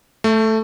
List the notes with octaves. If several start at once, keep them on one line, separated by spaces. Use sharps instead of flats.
A3